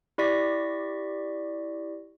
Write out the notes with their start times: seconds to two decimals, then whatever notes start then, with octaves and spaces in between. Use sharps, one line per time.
0.18 E4 G4 D5 C#6 A#6 B6